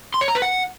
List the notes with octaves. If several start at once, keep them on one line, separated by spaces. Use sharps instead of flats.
C6
C#5
A#5
B4
F#5